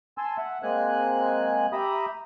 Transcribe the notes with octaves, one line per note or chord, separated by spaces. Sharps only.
G#5 A5 C6 E6
E5 F#5
G#3 A#3 C4 G#5 F#6
G4 E5 A#5 B5 D#6